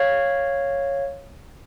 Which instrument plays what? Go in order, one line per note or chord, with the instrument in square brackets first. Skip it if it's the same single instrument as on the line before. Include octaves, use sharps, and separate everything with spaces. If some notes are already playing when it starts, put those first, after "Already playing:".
Already playing: [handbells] C#5 F5